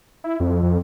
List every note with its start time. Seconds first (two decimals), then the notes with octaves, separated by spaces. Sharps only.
0.24 E4
0.40 F2
0.63 F2